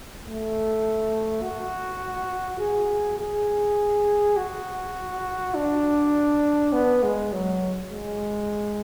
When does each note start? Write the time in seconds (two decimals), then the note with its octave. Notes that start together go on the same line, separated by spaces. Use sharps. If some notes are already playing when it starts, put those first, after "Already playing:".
0.23 A3
1.42 F#4
2.59 G#4
3.18 G#4
4.37 F#4
5.55 D4
6.73 B3
7.03 G#3
7.32 F#3
7.91 G#3